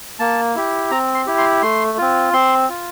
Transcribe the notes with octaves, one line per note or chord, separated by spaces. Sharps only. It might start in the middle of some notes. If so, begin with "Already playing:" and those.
A#3 A5
E4 G4
C4 A#5
C6
E4 G4
C6
A3 C6
C4 F4
C4 C6
F4